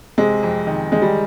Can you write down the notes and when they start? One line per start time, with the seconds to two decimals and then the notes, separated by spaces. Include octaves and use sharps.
0.18 C3 G#3
0.43 F2
0.67 D#3
0.92 D#3 G#3
1.02 G3